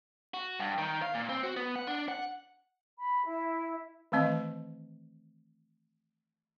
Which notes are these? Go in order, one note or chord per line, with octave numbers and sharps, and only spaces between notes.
F#4
G2
D#3
F5
A#2
C4
F#4
B3
F#5
D4
F#5
B5
E4
D#3 E3 A3 C4 D#5